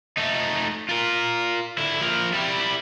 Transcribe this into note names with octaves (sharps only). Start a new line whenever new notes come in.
A3 D#4
F4 A#4
D3 E4
F3 A#4
G3 E4